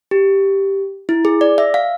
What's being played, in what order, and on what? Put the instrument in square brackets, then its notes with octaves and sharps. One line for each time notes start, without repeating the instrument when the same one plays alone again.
[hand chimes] G4
E4
G#4
D5
E5
F5